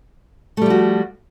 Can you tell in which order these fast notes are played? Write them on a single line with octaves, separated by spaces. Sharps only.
A3 G3 F3 F#4